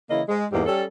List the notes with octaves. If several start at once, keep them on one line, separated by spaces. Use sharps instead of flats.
C#3 E3 A#3 E4 D#5
G#3
E2 G#2 G3 A#3 G4
G3 C#4 A4